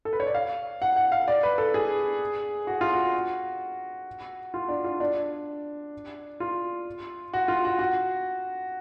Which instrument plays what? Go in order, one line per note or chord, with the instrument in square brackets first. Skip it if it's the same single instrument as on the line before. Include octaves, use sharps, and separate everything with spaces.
[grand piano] A4
B4
C#5
D5
F5
F#5
F#5
F5
D5
B4
A4
G#4
F#4
F4
F#4
F4
D4
F4
D4
F4
F#4
F4
F#4
F#4